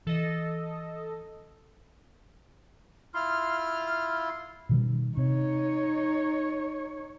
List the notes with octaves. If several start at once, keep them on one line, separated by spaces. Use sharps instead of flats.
E3 A4 D#5
E4 F4 C6 F6
B2 D#3 G3
C3 D#4 C#5